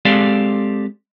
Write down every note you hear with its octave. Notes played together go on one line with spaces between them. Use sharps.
G#3 C4 G4 A4 D5 F5